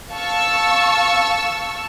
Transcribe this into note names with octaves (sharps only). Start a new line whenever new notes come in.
F5 A5 C#6 E6